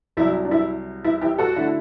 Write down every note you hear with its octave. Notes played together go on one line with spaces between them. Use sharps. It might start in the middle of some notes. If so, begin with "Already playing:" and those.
C2 C3 F#3 E4
D4
E4
E4
E4 G4
F#4 A4
D3 A3 E4